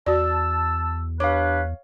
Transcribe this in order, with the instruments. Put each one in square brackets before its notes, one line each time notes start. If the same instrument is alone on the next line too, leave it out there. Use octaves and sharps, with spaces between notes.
[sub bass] E2 [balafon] F#4 D5 [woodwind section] A5 E6
[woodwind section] D4 G4 B4 [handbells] C#5 F5 [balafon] D6